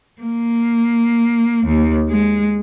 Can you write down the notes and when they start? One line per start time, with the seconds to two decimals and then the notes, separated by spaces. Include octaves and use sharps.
0.22 A#3
1.66 D#2
2.09 G#3